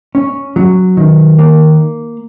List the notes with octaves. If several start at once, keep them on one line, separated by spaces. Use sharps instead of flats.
C#4
F#3
D#3
A#3